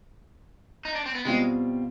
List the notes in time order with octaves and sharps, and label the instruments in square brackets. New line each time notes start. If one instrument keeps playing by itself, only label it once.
[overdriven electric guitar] D#4
D4
C4
B3
[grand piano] B2 G3 C4 F4 [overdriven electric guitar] G#3